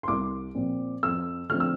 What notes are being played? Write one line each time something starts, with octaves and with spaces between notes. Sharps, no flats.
C6
C2 D6
A#2 F3 C4
F2 E6
D3 F3 A3 C4 F6
E6